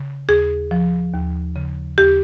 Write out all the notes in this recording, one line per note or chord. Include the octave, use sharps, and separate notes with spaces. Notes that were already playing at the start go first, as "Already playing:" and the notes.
Already playing: C#3
D#2 G#4
F3
D#2
C#3
D#2 G4